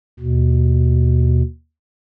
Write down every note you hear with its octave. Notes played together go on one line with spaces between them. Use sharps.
D#2 B2